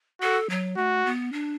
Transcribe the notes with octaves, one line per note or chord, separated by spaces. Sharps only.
F#4 A4
F#3
A3 F#4
B3
D4